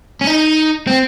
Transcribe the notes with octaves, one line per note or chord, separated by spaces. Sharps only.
C#4
D#4
C4